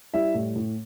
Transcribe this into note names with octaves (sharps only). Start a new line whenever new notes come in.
G3 E4 E5
A2
A2